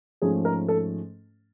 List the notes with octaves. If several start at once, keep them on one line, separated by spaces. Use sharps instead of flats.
G#2 F3 A3 C#4 G#4
A#4
A4